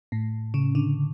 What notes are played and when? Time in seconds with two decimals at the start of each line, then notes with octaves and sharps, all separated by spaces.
0.12 A2
0.54 C#3
0.75 D3